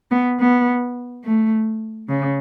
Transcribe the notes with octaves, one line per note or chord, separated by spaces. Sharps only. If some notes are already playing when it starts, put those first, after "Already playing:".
B3
B3
A3
C#3